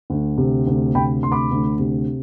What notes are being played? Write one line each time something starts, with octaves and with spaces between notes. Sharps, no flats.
D2
C3
D2
C3 G5 B5
D2 C6
B5 D6
D2
C3